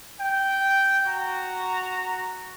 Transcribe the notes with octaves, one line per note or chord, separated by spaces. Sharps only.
G5
F#4 A#5